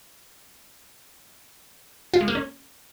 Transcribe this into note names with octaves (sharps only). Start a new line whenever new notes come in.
F4
G#3
A#3
C#4